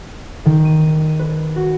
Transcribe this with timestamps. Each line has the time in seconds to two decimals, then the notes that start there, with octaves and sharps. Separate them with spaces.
0.46 D#3
0.65 D#7
1.19 B4
1.56 F#4